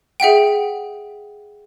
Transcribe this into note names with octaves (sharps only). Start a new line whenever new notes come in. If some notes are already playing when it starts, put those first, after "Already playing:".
G#4 E5 F#5 G5